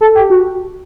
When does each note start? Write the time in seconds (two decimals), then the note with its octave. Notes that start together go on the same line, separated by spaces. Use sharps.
0.01 A4
0.15 G4
0.30 F#4